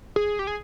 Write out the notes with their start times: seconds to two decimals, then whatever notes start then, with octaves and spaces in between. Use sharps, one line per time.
0.16 G#4
0.39 G4
0.47 G#4